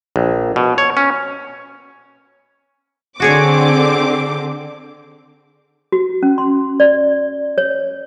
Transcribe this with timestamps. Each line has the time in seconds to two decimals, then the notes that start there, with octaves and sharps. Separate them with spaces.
0.16 A#1
0.56 B2
0.78 C#5
0.97 C#4
3.20 D3 C4 F#4 G#4 C#5 D6
5.92 F#4
6.23 C#4
6.38 C6
6.80 D5
7.58 C#5